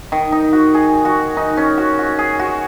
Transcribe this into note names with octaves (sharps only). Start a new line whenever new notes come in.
D#3
D#4
F#4
G#4
F#4
D#4
C#4
F#4
F#4
G#4
F#4